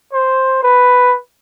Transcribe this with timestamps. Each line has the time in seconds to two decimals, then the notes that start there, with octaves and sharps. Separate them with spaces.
0.13 C5
0.63 B4